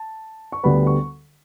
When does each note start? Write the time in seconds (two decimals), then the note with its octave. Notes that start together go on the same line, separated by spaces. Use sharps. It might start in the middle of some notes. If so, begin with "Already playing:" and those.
Already playing: A5
0.52 C#6
0.63 D2 D3 G3 B3 B5
0.87 C#6